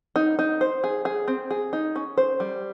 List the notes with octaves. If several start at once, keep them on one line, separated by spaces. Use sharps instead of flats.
D#4
D#4
C5
G#4
G#4
C4
G#4
D#4
C#4
C5
G3